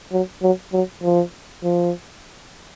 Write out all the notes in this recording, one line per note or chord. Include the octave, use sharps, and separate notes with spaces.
F#3
F#3
F#3
F3
F3